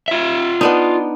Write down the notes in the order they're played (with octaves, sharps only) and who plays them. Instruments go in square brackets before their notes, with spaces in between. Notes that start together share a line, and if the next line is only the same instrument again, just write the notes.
[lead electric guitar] F4 E5
[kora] B3 D4 D#4